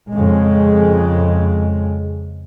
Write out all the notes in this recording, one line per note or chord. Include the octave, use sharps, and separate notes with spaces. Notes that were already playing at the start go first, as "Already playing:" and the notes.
F2 C#3 G#3